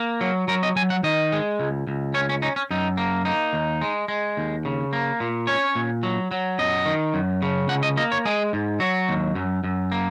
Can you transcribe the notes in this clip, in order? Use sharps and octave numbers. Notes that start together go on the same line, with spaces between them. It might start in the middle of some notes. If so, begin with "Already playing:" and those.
Already playing: A#3
F#3
F#3 A#4
D#5
F#3 G#5
F#5
D#3 D#5
G#3
C#2
C#2
C#4 C#5
C#4
C#4 D#4
C#4
F#2 D#4
A#3
A#3 D#4
D#2
G#3
G#3
D#2
C#3
A#3
A#2
C#4 C#5
A#2
F#3
F#3
F#2 D#5
D#3
F#2
C#3
C#2 F#5
D#5
A#3 D#5
C#5
G#3 G#4
G#2
F#3 F#4
D#2
F#2
F#2
A#3